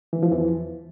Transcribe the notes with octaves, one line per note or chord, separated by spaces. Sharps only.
E3
F3
E2 E3